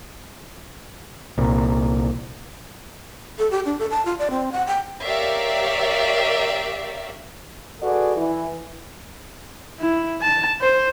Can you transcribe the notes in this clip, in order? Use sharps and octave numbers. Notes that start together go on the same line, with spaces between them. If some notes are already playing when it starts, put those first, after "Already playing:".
C2 A#2
A4
G4
D4
A4
A5
F4
D5
C4
F#5
G5
G4 A#4 C#5 D5 E5 F5
F#4 G#4 A4 B4 D5
E3
E4
A5
C5